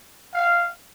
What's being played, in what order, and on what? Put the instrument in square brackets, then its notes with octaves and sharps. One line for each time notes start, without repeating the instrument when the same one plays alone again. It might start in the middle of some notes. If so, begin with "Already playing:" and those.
[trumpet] F5